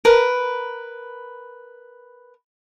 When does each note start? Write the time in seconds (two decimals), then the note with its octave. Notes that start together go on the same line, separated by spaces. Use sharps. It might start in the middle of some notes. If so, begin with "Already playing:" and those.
0.05 A#4 B4